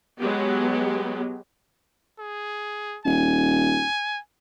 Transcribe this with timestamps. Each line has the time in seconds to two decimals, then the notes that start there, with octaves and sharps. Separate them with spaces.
0.19 F#3 G#3 B3 G4
2.19 G#4
3.05 D#1 G#5